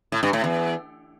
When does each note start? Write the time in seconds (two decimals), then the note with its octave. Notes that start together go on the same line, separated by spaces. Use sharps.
0.12 A2
0.23 G2
0.33 A2
0.44 E2